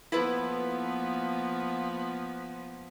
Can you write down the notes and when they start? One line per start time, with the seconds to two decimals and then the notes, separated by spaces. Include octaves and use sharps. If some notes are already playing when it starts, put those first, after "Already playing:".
0.12 F3 A#3 B3 E4 A4 B4